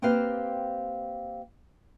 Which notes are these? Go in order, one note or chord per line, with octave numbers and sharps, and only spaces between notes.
A#3 C4 G4 B4 C5 F5